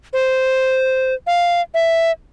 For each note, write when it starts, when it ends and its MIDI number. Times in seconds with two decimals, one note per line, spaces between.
0.13 1.14 72
1.27 1.61 77
1.74 2.11 76